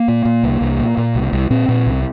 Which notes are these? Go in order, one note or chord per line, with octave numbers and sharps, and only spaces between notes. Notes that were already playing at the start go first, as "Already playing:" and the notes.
Already playing: A#3
A#2
A#2
C2
C2
A#2
A#2
C2
C2
A#2 C4
A#2
C2